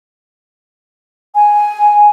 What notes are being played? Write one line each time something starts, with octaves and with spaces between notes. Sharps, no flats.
G#5